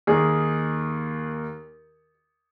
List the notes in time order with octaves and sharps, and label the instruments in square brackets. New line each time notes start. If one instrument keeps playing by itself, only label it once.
[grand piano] D#2 D#3 G#4